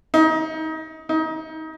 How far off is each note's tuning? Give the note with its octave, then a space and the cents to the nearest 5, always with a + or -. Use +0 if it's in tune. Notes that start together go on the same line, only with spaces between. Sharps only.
D#4 +25
D#4 +25